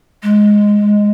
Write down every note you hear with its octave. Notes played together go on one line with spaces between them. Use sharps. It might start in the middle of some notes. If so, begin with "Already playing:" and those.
G#3